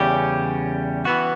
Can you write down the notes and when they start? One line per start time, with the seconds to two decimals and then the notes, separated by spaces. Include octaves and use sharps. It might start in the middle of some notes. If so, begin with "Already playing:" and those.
Already playing: E2 C#3 G3 C#4 G4
1.05 E3 B3 F#4